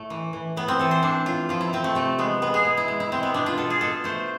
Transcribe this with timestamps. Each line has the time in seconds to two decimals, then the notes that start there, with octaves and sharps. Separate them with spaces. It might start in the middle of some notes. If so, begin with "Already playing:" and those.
Already playing: A2 A3
0.10 E3
0.33 E3
0.56 A2 B3
0.68 C4
0.79 E3 A4
0.91 C5
1.02 A2 D4
1.26 A2 F4
1.49 F3 F4
1.61 E4
1.73 F3 C4
1.84 A3
1.95 C3 A3
2.18 G#3 B3
2.42 G#3 B3
2.54 G#4
2.65 B2
2.77 E4
2.88 G#3
3.00 E4
3.12 G#3 C4
3.23 B3
3.34 B2 D4
3.46 F4
3.58 B2 A4
3.70 G#4
3.81 B2 A4
4.04 A3 C5